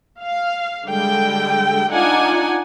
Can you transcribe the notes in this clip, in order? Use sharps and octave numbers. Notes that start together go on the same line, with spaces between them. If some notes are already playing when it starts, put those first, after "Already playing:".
F5
D3 G3 G#3 G5
D4 D#4 F4 D5 F#5 G#5